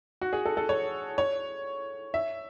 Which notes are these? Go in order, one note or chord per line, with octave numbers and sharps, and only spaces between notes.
F#4
G#4
A4
A4
C#5
C#5
E5